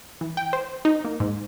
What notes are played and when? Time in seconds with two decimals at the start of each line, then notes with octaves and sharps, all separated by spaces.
0.21 E3
0.37 G5
0.53 C5
0.85 D#4
1.05 A#3
1.20 G#2